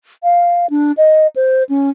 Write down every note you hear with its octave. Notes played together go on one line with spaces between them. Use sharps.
F5
D4
D#5
C5
C#4